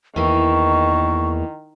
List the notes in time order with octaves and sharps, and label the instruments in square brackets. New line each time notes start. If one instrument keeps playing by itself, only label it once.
[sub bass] E2 [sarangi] D#3 [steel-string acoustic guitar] E3 A#3 [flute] C#6